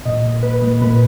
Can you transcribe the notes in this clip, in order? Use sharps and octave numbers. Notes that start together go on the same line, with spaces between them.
A#2 D#5
A#2
A#2 B4
A#2
A#2 B4